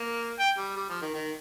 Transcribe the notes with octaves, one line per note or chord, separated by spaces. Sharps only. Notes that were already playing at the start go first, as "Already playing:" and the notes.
Already playing: A#3
G5
G3
G3
F3
D#3
D#3